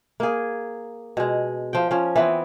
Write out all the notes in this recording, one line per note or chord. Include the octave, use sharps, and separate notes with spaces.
A#3 G#4
B2 G#3
F3 G5
F3 C#4
E3 B3 C4